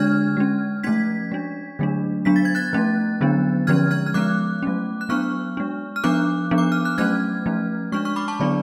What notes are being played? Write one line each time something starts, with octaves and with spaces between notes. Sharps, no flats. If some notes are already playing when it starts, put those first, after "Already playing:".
Already playing: D3 G#3 D4 F6 G#6
G#3 C#4
F3 A3 C#4 G#6 B6
G#3 D4
D3 F#3 A3 D4
F#3 B3 D4 B6
A6
G#6
F#6 A6
F3 A3 C#4
D3 F#3 B3 D4
D3 F3 G#3 C#4 F6 G#6
F6 G#6
F6
F3 G#3 B3 D6 F#6
F#3 A3 C#4
F#6
F#3 B3 D4 C#6 F6
G#3 D4
F6
F3 B3 D4 D6 F#6
F3 B3 D4
D6
F6
F#6
F#3 A3 C#4 F6 G#6
F3 A3 C#4
G#3 D4 C#6 F6
C#6 F6
B5 D6
A5 C#6
D3 F#3 B3 D4 D5